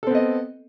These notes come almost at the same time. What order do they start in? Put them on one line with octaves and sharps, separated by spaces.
A4 C4 B3 D#5